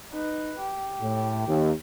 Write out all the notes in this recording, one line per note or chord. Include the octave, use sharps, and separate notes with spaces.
D#4 B4
G4
A2
D#2